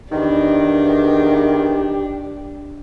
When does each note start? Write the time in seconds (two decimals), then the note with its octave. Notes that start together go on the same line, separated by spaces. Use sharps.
0.12 E2 D#3 D4 G4